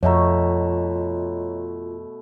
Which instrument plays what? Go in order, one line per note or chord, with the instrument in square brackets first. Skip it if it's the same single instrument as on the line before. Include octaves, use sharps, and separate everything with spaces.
[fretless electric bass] F2 [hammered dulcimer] B2 A3 [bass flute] F4 [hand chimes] C#5 D#5 A#5